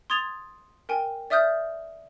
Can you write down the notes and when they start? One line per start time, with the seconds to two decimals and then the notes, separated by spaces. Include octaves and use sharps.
0.10 C6 D#6 G#6 A6 F7
0.89 A#4 G5 G#5
1.30 D5 E5 D#6 F6 G6